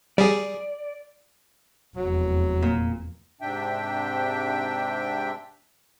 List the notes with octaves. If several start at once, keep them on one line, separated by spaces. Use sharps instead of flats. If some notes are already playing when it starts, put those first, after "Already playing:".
G3 G#4 D5
F1 E2 F#3
A#2
G#2 C3 D4 E5 G5